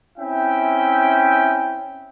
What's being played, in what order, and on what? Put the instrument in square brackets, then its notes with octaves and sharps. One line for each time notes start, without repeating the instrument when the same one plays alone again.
[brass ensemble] C4 C#4 E4 E5 G5